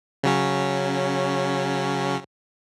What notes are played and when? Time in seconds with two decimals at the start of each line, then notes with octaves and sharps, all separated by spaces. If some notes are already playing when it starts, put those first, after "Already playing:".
0.23 C#3 F#3 C#4